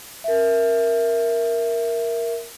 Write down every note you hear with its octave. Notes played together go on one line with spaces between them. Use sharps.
A#4 E5